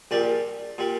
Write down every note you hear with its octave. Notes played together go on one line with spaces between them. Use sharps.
A#1 A#2 G3 D5
A#2 G3